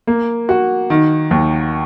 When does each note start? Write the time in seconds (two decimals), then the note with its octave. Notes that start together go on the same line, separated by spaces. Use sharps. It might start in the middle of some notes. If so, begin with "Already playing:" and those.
0.07 A#3
0.49 F#4
0.90 D#3
1.31 D#2